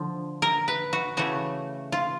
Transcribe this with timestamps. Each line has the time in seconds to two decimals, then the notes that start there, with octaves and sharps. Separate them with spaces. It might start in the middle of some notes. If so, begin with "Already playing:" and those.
Already playing: D3 F3
0.42 A#4
0.68 B4
0.93 F#4
1.17 C#3 E3 A3 F#4
1.92 F4